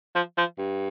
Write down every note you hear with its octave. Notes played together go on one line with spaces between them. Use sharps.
F3
F3
G2